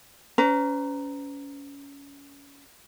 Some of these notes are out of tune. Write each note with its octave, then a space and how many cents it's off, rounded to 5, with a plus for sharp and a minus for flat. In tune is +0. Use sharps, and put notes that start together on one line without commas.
C#4 +25 B4 +45 A#5 +0